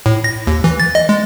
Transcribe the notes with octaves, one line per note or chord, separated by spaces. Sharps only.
A2
A#6
D#2
E3
A6
D#5
G#3